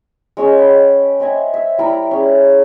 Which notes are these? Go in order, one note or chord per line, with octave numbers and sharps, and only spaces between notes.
G#3 C#4 G#4 E6
F#5 G5 B5
C4 D#5 E5 G#5
E5
G3 E4 A#4
C#4 G#4